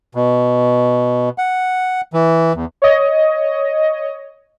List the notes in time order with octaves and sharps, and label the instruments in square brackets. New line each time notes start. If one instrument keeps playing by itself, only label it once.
[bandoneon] B2
F#5
E3
E2
[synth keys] C#5 D#5